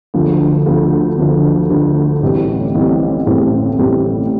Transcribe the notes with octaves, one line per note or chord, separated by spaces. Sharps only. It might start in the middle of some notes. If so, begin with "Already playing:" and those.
D2 D3 F3
D2 D3 F3
D2 D3 F3
D2 D3 F3
A1 A2 E3 G3 C4
A1 A2 E3 G3 C4
A1 A2 E3 G3 C4
A1 A2 E3 G3 C4